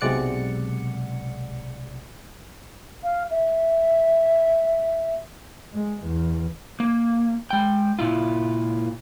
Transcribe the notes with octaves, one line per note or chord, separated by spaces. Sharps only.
B1 C3 G#3 D5 F#5 C#7
F5
E5
G#3
E2
A#3
G#3 G5
A#2 E4 F4